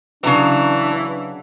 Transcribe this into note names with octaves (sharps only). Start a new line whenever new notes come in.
C#3 E3 F#3 D4 A#5